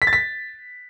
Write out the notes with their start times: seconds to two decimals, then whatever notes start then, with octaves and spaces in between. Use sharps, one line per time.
0.02 B6
0.07 A6
0.13 B6